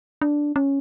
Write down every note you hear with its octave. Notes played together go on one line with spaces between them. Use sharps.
D4
C#4